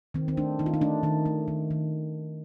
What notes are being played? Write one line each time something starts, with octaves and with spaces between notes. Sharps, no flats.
D#3 C4
C4
A3 D4
D#3 D#4
F4
D#4
A3 D4
D#3 D#4
A3
D#3
D#3